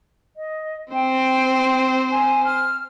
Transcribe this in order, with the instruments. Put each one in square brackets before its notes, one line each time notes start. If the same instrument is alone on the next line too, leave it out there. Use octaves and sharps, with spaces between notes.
[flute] D#5
[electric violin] C4 C5 [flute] G5
[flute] G#5
F6